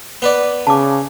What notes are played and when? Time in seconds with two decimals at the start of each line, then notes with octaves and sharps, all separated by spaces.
0.22 B3 B4 D5
0.67 C#3 A5 D6